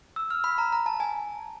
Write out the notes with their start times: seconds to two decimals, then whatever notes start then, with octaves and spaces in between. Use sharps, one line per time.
0.16 E6
0.31 F6
0.44 B5
0.58 A#5
0.72 A#5
0.86 A5
1.00 G#5